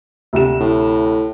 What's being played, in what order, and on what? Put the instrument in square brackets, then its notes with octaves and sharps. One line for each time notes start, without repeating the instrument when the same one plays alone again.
[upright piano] D2 C3 E7
[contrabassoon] A2